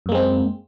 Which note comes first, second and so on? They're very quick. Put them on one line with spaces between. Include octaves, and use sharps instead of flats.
F#2 A#3 G#3 C4